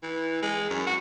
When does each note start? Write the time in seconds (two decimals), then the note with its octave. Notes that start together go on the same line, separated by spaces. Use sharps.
0.03 E3
0.42 G#3
0.70 F#2
0.87 F#4